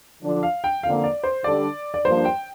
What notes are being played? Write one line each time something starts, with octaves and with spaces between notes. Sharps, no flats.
D3 F3 D4
F5
G5
F2 D3 A#3 F5
D5
C5
D3 G3 D4 D5
D5
G2 F3 A#3 D4 C5
G5